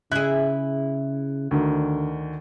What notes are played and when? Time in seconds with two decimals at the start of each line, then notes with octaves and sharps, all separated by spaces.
0.12 C#3 E4 G#4 F#6
1.51 D2 D3 D#3